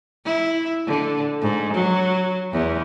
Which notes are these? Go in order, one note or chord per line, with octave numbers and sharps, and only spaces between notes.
E4
D3
G#2
F#3
E2